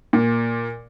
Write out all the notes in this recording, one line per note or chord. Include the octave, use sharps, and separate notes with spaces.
A#2